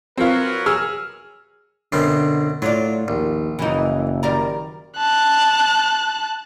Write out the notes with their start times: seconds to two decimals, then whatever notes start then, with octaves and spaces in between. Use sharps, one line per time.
0.18 F#3 C4 F4 A#4 B4
0.66 G#4 E6 F6
1.92 F#2 B2 D3 C4
2.62 A2 F#3 F4 D5
3.08 A#1 D#2
3.59 F#1 E3 D#4
4.23 D#3 G3 A#4
4.98 A5 F#6